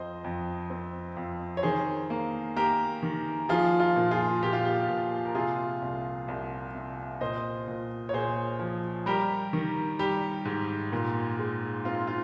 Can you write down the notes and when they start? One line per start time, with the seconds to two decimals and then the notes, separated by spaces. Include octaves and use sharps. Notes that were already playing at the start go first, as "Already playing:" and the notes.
Already playing: F2 C5 D#5
0.24 F2
0.70 C4
1.17 F2
1.57 C#5
1.63 D#3 G#4 C5
2.10 A#3
2.56 A#3 G4 A#4
3.03 D#3
3.49 F3 F4 G#4
3.80 F4
3.96 A#2
4.11 F4 G#4
4.43 A#2 G4
4.53 F4
4.65 G4
4.89 A#2
5.25 A#4
5.35 C3 F4 G#4
5.82 C2
6.28 C2
6.75 C3
7.21 A#2 C5 D#5
7.68 A#2
8.09 C#5
8.13 A#2 G#4 C5
8.60 F3
9.06 G3 G4 A#4
9.53 D#3
9.99 G3 G4
10.45 G#2
10.93 A#2
11.39 G#3
11.85 C4 F4
12.07 F4